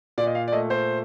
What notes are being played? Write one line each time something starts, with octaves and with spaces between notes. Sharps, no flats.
A#2 D5
D#5
F5
D5
A3 D#5
C5